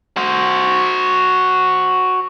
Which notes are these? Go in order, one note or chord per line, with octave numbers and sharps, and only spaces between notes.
F#4 C5